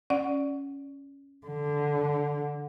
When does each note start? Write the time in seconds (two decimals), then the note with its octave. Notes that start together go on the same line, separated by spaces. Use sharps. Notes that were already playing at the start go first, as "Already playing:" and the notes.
0.10 C#4 D5 F#5
1.47 D3